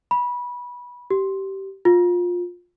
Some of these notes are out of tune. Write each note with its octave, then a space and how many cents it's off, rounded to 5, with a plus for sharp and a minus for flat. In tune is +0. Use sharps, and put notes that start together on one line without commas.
B5 -20
G4 -20
F4 +20